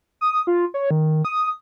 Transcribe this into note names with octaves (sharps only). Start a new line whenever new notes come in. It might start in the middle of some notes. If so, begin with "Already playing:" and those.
D#6
F4
C#5
D#3
D#6